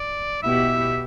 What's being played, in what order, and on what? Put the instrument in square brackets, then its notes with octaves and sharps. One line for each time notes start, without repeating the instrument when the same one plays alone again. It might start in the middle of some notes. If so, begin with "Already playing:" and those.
Already playing: [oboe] D5
[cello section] B2 B3 E4 G4 [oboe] E5